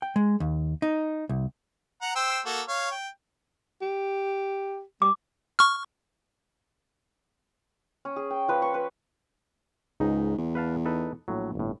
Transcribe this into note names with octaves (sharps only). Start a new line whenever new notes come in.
G5
G#3
D#2
D#4
C2
F#5 A#5
C5 G5 E6
A#3 F#4 A4
C#5 F5
G5
G4
G3 D6
C#6 F6
C#4
G#4
G5
F3 B4
C#6
B4
C#2 G#2 D#4
E2
B4 F5 A5
D#4 A4 B4
A#1 A2 F#3
G1 A2